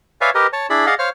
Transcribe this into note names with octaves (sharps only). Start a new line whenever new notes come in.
B4 C#5 D5 E5 F5 G#5
G4 A#4 B4 D#5
C#5 A5
D4 E4 G#4 D5 B5
G#4 D5 D#5 F5 F#5
C5 C#5 F5 F6